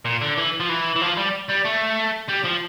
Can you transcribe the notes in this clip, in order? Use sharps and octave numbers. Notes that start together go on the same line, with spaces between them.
A#2
D3
E3
F3
E3
E3
F3
G3
G3
A3
G3
F3